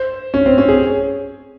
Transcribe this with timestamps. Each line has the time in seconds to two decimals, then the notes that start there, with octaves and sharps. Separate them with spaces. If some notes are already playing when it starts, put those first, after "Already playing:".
Already playing: C5
0.34 C#4
0.46 C4
0.58 C#4
0.69 G#4